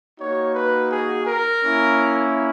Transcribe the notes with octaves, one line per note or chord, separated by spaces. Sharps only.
A#3 D#4 F#4 C#5
B4
G#4
A#4
A#3 C#4 E4